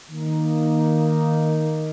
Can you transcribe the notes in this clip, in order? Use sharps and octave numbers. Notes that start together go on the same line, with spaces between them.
D#3 A#3 D#4